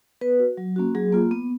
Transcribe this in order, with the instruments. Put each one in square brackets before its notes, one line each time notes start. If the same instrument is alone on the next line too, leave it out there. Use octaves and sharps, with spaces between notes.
[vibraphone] B3 B4
F#4
F#3
A#3 C#4 F#4
F#3 G#4
A#3 F4
B3